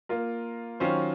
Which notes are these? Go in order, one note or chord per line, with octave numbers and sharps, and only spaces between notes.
A#3 F4 A#4
D#3 F#3 C#4 F4 C5